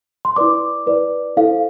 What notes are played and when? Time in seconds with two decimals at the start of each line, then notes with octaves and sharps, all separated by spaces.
0.25 C6
0.36 E4 B4 D5 D6
0.86 E4 B4 D5
1.37 E4 A4 C5 F5